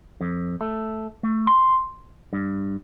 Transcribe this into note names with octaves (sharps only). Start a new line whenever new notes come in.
F2
A3
A3
C6
G2